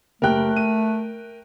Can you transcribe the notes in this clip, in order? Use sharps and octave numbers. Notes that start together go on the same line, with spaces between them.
F#1 A3 G4 A#4 G5 F#6
D#7